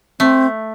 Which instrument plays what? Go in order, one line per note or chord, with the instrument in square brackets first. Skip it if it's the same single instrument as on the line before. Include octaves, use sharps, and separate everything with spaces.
[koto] A3 [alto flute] C4